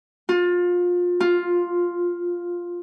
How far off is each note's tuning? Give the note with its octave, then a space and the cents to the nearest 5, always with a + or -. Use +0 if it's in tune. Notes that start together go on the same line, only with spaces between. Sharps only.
F4 +25
F4 +5